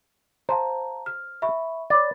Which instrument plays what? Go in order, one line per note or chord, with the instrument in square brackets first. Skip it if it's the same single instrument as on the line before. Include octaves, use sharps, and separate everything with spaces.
[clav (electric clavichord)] C5 [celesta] F5 A5 A#5
[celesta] F6
E5 B5 C#6
[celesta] C#5 B5 A6 [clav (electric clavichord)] D5